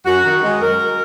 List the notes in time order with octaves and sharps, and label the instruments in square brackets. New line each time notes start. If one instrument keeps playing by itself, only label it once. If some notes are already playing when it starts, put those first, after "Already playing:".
[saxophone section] F#2 F#4
D#3
G#3
F#2 A#4